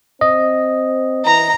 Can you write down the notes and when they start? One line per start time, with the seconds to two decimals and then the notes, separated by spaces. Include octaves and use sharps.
0.21 C4 D#5
1.26 E3 A#5